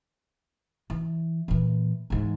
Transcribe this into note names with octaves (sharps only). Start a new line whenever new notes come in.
E3
A#2 E3
G#2 E3